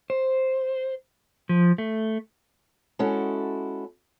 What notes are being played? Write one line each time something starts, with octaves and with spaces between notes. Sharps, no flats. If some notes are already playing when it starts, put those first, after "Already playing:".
C5
F3
A3
G#3 C#4 E4 F#4 A4